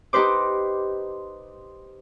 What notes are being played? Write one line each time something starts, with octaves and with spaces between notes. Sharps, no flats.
D#4 G4 B4 C5 D6